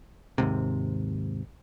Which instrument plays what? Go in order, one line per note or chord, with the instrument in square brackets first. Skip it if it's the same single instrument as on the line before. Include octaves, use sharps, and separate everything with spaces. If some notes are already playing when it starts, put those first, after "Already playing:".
[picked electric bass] G#1 D#2 G#2 C3